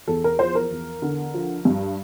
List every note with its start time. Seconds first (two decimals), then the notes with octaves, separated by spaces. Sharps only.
0.08 E2 A4
0.24 A#4
0.39 F3 C5
0.55 A#4
0.71 E2
1.02 D3
1.34 F3
1.65 G2